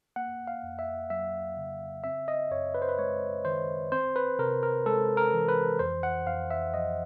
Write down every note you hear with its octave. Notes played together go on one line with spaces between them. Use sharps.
A#3 F#5
F5
F2
E5
F#3 E5
C#3
C4 E5
D#5
F#2 C#5
B4
C5
B4
G#3 C#5
D#3 C5
C4 C5
B4
C3 A#4
A#4
G#3 A4
A#4
E3
B4
F2 C5
F#5
F2 F5
E5
F3 D#5